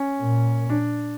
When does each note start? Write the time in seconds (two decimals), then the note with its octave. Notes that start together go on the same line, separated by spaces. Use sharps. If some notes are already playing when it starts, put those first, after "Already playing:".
Already playing: C#4
0.20 A#2
0.70 D4